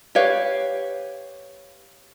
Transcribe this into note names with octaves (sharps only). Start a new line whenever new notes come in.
G4 B4 C#5 F5